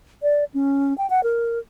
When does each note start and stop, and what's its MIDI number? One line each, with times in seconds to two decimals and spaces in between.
0.23 0.44 74
0.54 0.96 61
0.98 1.09 79
1.10 1.23 78
1.23 1.59 70